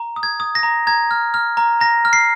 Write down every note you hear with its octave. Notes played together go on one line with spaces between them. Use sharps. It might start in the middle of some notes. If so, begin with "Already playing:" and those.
Already playing: A#5
D#6
G#6
D#6
A#6
A#5
A#5 G#6
F6
F6
A#5
A#5 A#6
F6
C7